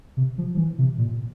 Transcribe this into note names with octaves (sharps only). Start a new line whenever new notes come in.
C3
F3
F3
E3
C3
A#2